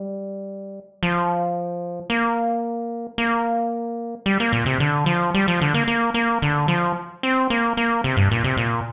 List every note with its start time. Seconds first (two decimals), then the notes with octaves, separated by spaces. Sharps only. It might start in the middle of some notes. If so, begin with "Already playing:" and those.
Already playing: G3
1.03 F3
2.10 A#3
3.18 A#3
4.26 G3
4.40 A#3
4.53 A#2
4.66 C3
4.80 D3
5.06 F3
5.34 G3
5.48 F3
5.61 D3
5.74 A#3
5.88 A#3
6.14 A#3
6.42 D3
6.68 F3
7.23 C4
7.50 A#3
7.77 A#3
8.04 C3
8.17 G2
8.31 A#2
8.44 C3
8.57 A#2